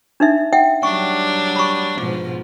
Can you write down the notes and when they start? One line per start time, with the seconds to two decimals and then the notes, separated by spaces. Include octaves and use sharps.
0.20 D4 D#4 E5
0.53 E5 F#5 G5
0.83 F#3 G3 D4 C#6
1.56 B5 C#6
1.98 G#2 B2 F3